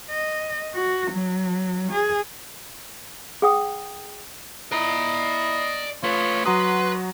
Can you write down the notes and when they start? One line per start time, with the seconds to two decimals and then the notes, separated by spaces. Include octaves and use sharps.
0.11 D#5
0.74 F#4
1.12 F#3
1.92 G#4
3.42 G#4 F#5 G5 D#6
4.72 E4 D5 D#5 A#5
6.03 A3 F4 B4 C#5
6.45 F#3 F#4 B4 A#5 C6 D#6